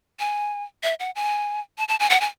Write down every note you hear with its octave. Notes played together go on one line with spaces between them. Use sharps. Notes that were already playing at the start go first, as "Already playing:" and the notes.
G#5
E5
F#5
G#5
A5
A5
G#5
F#5
G#5